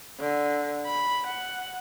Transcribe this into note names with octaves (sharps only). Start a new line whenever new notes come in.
D3
B5
F#5